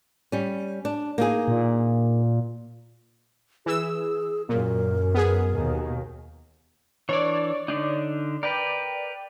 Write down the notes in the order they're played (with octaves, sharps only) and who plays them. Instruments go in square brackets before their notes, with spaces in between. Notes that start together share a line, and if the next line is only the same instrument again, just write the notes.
[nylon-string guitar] G3 C#4
D4
A#3 D#4 G#4
[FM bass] A#2
[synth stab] E3 E6 [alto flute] G#4
[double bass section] F#2 [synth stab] A#2 [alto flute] A#4
[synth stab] B3 G#4
[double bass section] D#2 B2 D#3
[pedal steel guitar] E3 D4 [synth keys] C#5 D5
[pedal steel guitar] D3 D4 D#4
[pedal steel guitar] A#4 B4 [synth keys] D5 G5